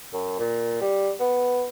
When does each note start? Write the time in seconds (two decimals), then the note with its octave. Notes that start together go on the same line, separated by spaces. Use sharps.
0.13 F#2
0.39 A#2
0.81 G3
1.20 B3